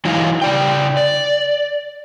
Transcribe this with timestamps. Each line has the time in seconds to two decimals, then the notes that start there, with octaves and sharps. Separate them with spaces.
0.05 E3 F#3 D#4 E4 F5
0.42 C#3 D5 G5
0.97 D5